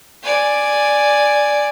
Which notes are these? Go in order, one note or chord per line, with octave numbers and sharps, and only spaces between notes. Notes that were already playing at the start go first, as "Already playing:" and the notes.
D5 G#5